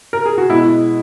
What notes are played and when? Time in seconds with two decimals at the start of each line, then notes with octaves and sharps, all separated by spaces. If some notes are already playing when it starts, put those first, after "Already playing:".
0.13 A#4
0.26 G#4
0.38 F#4
0.50 B2 G#3 B3 E4